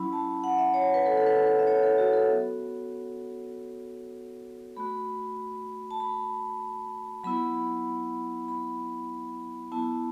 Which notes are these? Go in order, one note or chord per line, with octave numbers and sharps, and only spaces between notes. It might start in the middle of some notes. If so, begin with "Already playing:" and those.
Already playing: F#3 C#4 E4 B5
A5
F#5
E5
C#5
B4
A4
A4
B4
B4
E5
C#5
A4
F#4
A4
B3 F#4
A3 F#4 B5
A5
B5
F#3 B3 E4 B5
B5
B3 E4 A5